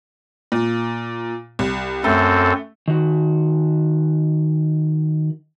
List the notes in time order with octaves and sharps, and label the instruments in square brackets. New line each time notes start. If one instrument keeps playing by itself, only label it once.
[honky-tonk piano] A#2
C2
[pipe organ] F#2 C4 A4 [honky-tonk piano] A3
[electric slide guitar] D#3 F#4